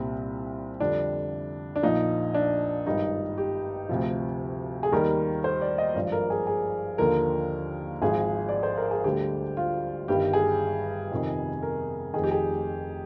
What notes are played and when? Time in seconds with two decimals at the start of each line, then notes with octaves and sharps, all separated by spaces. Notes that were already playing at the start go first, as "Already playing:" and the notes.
Already playing: C2 A#2 G3 C4
0.80 F2 D3 G3 D4
1.76 D4
1.83 A#1 A#2 F3 D#4
2.34 D4
2.86 G#1 G2 D#3 G3 D#4
3.38 G4
3.89 D2 C3 F3
4.83 G#4
4.92 D#2 D#3 G3 A#4
5.44 C5
5.61 D5
5.78 D#5
5.95 G#1 G2 F3 D5
6.12 A#4
6.30 G#4
6.47 G#4
6.98 D#2 D3 F3 A#4
8.02 G#1 G#2 F3 G#4
8.49 D5
8.63 C5
8.77 A#4
8.91 G#4
9.04 D2 D3 G3 G4
9.57 F4
10.08 G1 G2 D#3 G3 G4
10.33 G#4
11.12 F2 C3 D#3
11.62 A#4
12.14 F1 F2 D#3 G#4
12.24 G4
12.31 G#4